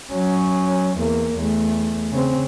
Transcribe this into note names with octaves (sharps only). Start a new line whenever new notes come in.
F#3 C#4
E2 A#3
E2 A3
C#3 C4